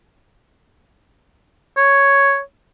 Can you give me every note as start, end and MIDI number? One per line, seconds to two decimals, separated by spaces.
1.77 2.41 73